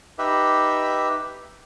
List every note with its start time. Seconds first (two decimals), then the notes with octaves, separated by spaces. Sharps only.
0.19 D#4 G4 B4 E5